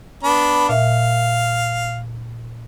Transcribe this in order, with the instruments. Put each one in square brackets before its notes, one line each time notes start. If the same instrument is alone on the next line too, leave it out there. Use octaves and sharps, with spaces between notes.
[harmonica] B3 D4 B5
[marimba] A#2 E5 [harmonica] F5